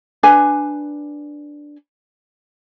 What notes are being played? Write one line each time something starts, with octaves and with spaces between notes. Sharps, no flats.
D4 B4 G#5